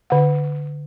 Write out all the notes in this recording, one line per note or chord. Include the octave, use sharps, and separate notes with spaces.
D3 F#5